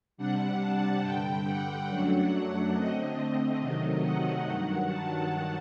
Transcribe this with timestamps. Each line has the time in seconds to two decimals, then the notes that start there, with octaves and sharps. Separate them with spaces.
0.17 C3 G3 D4 F#5
0.60 A5
1.03 G2 D3 G3 G5
1.45 F#5
1.88 F#2 F#3 A3 D4
2.74 D3 A3 C4 D#5
3.60 C3 D#3 F#3 A3
4.03 F#5
4.45 G2 D#3 F#3
4.88 A5